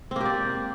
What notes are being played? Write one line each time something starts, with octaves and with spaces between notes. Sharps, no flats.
A#3 C4 G4 D5